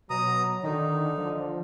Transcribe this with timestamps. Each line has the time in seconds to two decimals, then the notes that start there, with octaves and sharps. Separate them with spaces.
0.10 B2 F#3 A#5 D#6
0.64 D3 D#3 D#4
1.18 F3